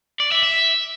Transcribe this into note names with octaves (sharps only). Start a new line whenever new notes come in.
D5
E5
E5